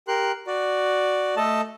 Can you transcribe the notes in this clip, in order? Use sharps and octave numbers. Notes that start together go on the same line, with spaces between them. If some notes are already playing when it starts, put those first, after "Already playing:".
G4 A#4 C6 F#6
F#4 D5
A3 A4 D#5 A5